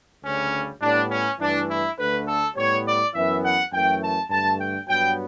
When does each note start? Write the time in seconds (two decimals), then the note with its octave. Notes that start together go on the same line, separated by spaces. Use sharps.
0.23 D2 C#3 G3 C#4
0.81 A2 G3 B3 D4
1.10 C#4
1.39 G2 E3 A3 D4
1.68 E4
1.97 D2 D3 A3 B4
2.26 A4
2.55 A2 G3 B3 C#5
2.85 D5
3.14 F#2 E3 B3 E5
3.43 F#5
3.72 F#2 E3 A3 G5
4.01 A5
4.30 G2 D3 A3 A5
4.59 G5
4.88 G2 F#3 B3 G5